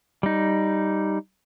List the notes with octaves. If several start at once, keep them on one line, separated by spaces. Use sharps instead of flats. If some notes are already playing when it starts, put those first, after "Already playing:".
G3 D#4